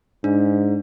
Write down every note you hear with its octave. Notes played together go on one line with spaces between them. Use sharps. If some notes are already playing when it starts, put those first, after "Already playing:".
G#2 D4